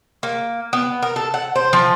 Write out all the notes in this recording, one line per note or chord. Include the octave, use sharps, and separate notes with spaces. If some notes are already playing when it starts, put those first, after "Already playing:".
A#3
B3
A#4
A4
F#5
C5
F3